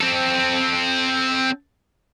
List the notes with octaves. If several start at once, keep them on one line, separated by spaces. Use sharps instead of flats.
C4 A4